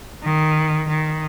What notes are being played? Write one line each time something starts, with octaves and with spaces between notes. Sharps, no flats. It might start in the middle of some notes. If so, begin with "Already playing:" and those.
D#3
D#3